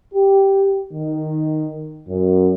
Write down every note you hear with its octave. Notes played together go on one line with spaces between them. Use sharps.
G4
D#3
F#2